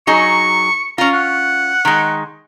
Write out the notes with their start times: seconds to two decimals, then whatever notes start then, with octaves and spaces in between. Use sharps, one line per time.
0.07 F#3 D#4 G#4 C#6
0.98 C#4 F4 A#5
1.14 F#5
1.85 D#3 G#3